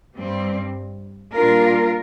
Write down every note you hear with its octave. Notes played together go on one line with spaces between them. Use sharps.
G2 G3 C4
A#2 G3 D4 F4 A#4